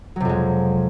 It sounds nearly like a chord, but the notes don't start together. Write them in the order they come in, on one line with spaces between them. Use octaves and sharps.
F#3 C3 F2 G#3